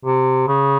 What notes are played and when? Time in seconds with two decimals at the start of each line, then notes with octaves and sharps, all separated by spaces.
0.05 C3
0.48 C#3